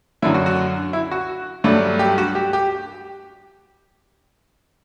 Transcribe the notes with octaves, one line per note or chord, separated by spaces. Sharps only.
F#2 D3 F#3 E4
F#4
F#4
E4
F#4
G2 F#3 A3 D4
G4
F#4
G4
G4